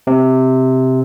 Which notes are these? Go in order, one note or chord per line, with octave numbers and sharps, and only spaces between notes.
C3